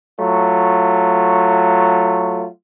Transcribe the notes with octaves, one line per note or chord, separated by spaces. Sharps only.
F#3 A3 F4